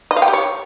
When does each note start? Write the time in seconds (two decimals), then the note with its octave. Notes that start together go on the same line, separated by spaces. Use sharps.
0.11 D#5
0.16 F5
0.22 G5
0.28 G4
0.33 C#5